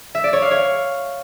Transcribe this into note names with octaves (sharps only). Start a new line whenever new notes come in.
E5
D5
C#5
F5
C#5